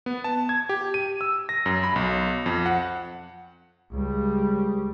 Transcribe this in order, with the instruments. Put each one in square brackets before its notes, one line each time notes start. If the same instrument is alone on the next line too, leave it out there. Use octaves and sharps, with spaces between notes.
[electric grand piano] B3
A5
G#6
G4
D#7
E6
A#6
F#2
B5
B1
F2
F#5
[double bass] C#2 G3